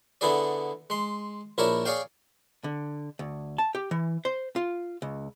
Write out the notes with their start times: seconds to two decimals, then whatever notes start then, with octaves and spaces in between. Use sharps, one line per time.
0.21 D3 B3 E4 G#4 D5
0.90 G#3 C6
1.58 A#1 E4 A#4 C#5 D5 A5
1.85 G#4 C#5 D5 F5 G5
2.64 D3
3.19 D2
3.58 A5
3.75 G4
3.91 E3
4.25 C5
4.56 F4
5.02 C#2